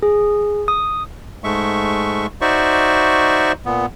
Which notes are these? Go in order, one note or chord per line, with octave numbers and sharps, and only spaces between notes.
G#4
D#6
G#2 G#3 A3 E5 C#6
D#4 F#4 C5 D5 E5 C#6
A#2 B3